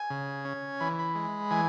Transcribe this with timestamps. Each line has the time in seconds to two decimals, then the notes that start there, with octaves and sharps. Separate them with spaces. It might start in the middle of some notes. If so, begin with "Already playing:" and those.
Already playing: G#5
0.10 C#3
0.45 C#4
0.80 E3 B5
0.99 B5
1.15 G#3
1.51 E3 G#5